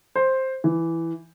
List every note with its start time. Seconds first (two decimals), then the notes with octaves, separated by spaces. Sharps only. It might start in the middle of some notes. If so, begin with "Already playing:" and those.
0.15 C5
0.64 E3